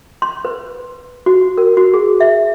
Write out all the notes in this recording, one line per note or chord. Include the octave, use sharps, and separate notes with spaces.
C6
B4
F#4
A#4
F#4
G#4
E5